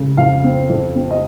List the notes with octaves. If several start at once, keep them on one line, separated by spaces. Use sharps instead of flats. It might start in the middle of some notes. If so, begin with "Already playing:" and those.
Already playing: C#3
F2 F5
C4
F2
C4
D#5